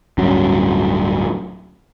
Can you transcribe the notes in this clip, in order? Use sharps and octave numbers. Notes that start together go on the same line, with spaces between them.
D1 G2 F#3 C#4